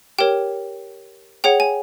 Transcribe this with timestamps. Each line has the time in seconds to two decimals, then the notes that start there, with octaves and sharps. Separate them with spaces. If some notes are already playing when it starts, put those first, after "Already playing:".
0.19 G4 A#4 C#5 G5
1.44 G#4 C#5 F#5 G5
1.60 G#5